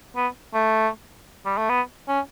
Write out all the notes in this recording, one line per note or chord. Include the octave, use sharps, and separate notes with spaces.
B3
A3
G3
A3
B3
C#4